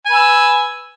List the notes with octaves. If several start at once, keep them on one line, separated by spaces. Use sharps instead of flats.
B4 G#5 E6